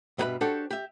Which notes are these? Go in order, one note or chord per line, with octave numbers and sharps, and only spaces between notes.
G2 B2 F4 A4 B4 E5
D4 F#4 G4 A4 C5 C#5
G4 E5